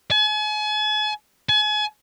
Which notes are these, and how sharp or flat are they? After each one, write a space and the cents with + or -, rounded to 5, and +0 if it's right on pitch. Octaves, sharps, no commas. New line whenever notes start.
G#5 +40
G#5 +35